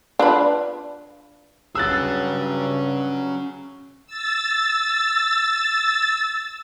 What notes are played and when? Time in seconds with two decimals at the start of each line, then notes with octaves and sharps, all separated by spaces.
0.19 D4 F4 B4
1.75 G2 F#3 C#4 G#4 E6 F#6 A6
4.06 E6 A6